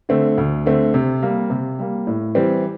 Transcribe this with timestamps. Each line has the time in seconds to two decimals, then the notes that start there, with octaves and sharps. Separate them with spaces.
0.09 D3 A3 C4
0.38 D2
0.66 D3 A3 C4
0.94 C3
1.22 G3 A#3
1.50 C3
1.79 G3 A#3
2.07 A2
2.35 E3 G3 C4